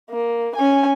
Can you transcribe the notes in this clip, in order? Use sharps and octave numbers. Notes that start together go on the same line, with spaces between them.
A#3
C#4 G#5